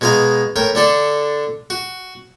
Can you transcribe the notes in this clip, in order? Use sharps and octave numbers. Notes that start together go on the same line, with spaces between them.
B2 G#3 D#5 F5 A#5
A2 A#4 G5
D3 D4 A4
F#4